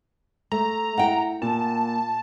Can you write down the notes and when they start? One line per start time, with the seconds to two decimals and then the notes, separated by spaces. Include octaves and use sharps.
0.52 A3 A#5
0.97 E4 F#5 G5
1.42 A#2 A5